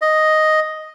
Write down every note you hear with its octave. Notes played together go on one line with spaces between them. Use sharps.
D#5